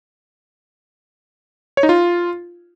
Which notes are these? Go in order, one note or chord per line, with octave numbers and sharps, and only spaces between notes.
C#5
D#4
F4